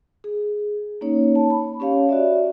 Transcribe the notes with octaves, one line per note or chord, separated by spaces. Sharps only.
G#4
A#3 C#4 D#4 C#5
A5
B5
C#4 G4 C#5 F5
F#4 D5 E5